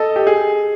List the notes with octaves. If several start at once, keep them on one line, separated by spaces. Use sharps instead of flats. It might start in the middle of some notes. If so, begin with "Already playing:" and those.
Already playing: A4 D#5
G4
G#4